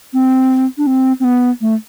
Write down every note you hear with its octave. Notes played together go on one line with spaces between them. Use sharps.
C4
D4
C4
C4
B3
A3